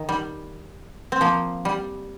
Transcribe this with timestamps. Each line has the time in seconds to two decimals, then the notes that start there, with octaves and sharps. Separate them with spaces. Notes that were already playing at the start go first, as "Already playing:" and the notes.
Already playing: D#3
0.09 G3
1.12 C4
1.21 F3 A#3
1.65 G3